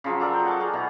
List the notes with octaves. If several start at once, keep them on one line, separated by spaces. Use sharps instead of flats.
C#3 F3 F#3
A4 A#4 D5 A#5
G5
F#5 G5 A5 A#5
F#4 G#4 A#4
B2 E3 A#5